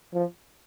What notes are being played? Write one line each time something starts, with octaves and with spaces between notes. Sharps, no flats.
F3